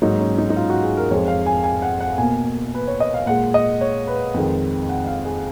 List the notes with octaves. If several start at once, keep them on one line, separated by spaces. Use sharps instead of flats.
G#2 F#3 A#3 D#4
C#4
D#4
D#4
F4
F#4
G#4
A#4
F2 F3 G#3 C#5
F5
G#5
G#5
F#5
F#5
B2 A#3 G#5
B4
C#5
D#5
F5
A#2 G#3 F#5
D#5
C#5
B4
F2 D#3 G#3
F#5
F5
G#4